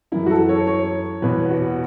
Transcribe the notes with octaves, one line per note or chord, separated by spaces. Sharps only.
F#2 E3 E4
F#4
A4
C#5
C#5
E2 B2 B4
F#4